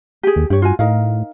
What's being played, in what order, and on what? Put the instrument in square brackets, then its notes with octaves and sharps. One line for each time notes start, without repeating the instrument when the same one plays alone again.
[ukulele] G4 G#4
[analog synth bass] D#2
[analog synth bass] G2 [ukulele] G4 C#5
[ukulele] F4 F#4 G#5
[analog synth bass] A2 [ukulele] D#4 A#4 F5